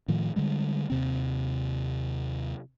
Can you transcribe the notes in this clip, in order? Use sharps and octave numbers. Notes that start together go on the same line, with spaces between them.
A2 D#3 F3
D3 G3 G#3
D#2 C3 C4